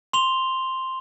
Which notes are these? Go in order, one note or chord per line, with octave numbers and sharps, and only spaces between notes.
C6 F7 G7